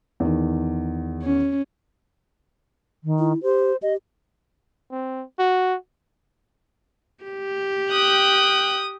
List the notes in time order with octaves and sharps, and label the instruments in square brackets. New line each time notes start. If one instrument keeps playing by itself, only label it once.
[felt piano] E2 D#3
[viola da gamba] C#4
[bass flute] D#3
[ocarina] E4
[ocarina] G4 [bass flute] C5
[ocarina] G4 [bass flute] D#5
[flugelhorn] C4
F#4
[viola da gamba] G4
[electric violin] G5 F#6 [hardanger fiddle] D#6